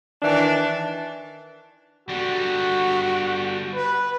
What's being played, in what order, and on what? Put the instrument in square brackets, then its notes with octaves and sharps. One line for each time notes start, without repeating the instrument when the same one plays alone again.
[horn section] D#3 E3 D4
[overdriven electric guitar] D3 G3 [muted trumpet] F#4
[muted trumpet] B4